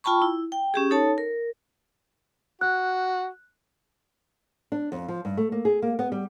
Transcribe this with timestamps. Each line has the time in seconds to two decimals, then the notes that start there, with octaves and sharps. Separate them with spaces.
0.04 F4 G5 A5 B5 C#6
0.22 E4
0.52 G5
0.74 C#4 G4 G#4
0.91 D#4 A4 C#5 A5
1.18 A#4
2.61 F#4 F#6
4.72 D4
4.92 F2
5.08 F3
5.25 G2
5.37 A3
5.52 A#3
5.65 G#4
5.82 A#3
5.99 B3
6.12 G3